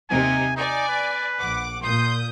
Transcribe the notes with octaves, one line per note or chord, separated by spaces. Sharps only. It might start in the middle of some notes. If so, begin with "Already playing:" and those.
D#2 C3 D#4 G#5
D#4 D5 G#5
B4
A#1 F#5 D6
A#2 C6 D#6 G6